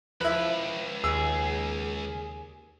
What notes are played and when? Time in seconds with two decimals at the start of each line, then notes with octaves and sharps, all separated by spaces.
0.21 C#2 F3 E4 B4 B5
1.04 D#2 G#4 E6